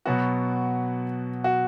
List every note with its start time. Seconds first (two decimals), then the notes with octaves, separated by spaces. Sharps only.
0.05 B2 F#3 B3 F#4
1.44 F#4